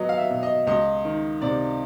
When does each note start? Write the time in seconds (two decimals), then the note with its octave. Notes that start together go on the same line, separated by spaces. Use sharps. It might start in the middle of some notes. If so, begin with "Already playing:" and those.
Already playing: F#3 B3 D#5
0.09 F5
0.18 E5
0.30 B2
0.43 D#5
0.67 C#2 D#5
1.05 D#3
1.41 C3 D5